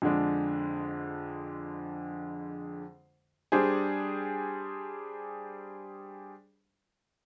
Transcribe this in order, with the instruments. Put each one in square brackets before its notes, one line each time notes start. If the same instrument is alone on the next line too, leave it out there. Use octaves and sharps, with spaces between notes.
[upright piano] F2 D3 G#3 D4
G3 D4 G#4 C5